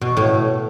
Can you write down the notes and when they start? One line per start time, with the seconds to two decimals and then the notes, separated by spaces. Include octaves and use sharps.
0.01 B2
0.17 A2